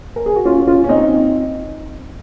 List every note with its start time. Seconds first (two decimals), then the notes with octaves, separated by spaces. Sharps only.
0.16 A#4
0.26 G#4
0.36 F#4
0.45 C#4 F4
0.67 C#4 F4
0.84 C#4
0.89 C4 D#4